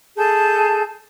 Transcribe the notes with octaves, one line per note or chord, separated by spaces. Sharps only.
G#4 A4 A5 G6